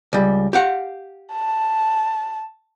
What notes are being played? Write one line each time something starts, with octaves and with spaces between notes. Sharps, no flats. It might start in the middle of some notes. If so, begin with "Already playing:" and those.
C#2 G3
G4 F5 F#5
A5